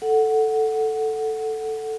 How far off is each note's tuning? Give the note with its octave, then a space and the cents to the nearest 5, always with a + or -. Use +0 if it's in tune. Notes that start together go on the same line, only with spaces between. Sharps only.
A4 +0 F#5 +0